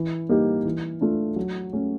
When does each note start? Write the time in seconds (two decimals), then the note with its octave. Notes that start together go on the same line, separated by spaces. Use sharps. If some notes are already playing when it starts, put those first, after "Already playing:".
Already playing: E3
0.29 G3 A#3 D#4 G4
0.65 E3
1.01 A3 D4 F4
1.36 F#3
1.73 A3 C#4